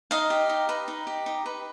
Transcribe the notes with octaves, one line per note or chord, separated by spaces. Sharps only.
D#4 D#5 F5
G4
D#4
B4
D#4
G4
D#4
B4